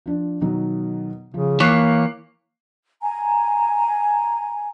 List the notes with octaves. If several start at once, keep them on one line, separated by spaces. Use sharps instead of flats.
F3 D4
B2 D#3 F#3
C#3 F3
E3 A#3 C#5 D6 F#6 C7
G#5 A#5